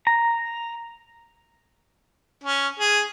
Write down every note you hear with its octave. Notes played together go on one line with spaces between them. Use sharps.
A#5
C#4
G#4